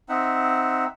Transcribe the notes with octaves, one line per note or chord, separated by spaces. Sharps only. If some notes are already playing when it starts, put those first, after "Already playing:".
C4 D#4 E5 F#5